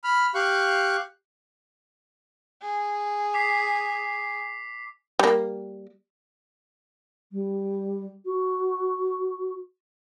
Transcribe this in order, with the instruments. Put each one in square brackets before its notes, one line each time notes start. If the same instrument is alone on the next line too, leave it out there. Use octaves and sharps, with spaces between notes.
[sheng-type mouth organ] B5 F6
G4 F5 C#6 F#6
[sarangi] G#4
[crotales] D6 B6 C7
[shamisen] G3 A#3
[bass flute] G3
F#4